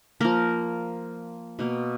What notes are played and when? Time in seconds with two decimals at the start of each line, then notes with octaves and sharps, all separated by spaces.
0.20 F3 A#3 A#4
1.59 B2 A#3